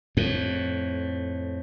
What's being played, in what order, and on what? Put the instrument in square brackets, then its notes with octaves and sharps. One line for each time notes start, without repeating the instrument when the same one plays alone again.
[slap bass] F2 A2